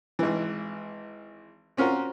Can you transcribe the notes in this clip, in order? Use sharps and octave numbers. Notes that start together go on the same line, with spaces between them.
G#1 E3
C4 C#4 F4 F#4 A#4